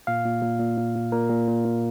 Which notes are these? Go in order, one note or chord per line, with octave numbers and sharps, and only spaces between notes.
A#2 F5
A#2
A#2
A#2
A#2
A#2
A#2 A#4
A#2
A#2
A#2